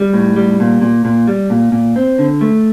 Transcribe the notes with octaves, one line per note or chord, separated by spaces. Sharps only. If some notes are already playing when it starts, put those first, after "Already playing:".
Already playing: G3
A2
G3
A#2
A#2
A#2
G3
A#2
A#2
C4
D3
A3